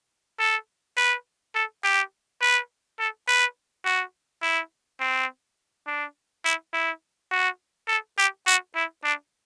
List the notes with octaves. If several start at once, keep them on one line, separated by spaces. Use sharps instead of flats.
A4
B4
A4
G4
B4
A4
B4
F#4
E4
C4
D4
E4
E4
F#4
A4
G4
F#4
E4
D4